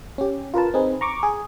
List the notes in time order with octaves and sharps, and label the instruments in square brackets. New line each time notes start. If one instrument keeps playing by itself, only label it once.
[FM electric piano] C#4 G4
F4 A#4 B4 A5
C4 D#4 G#4 B4
A#5 C#6 D6
G#4